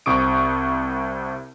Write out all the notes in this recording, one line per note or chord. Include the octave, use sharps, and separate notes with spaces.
C2 C3 C#6 D#6 D7